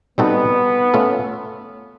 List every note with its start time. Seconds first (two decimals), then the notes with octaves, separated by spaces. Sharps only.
0.18 G3 B3 C4 D#4 F#4 A4
0.94 A3 C#4 F4 A4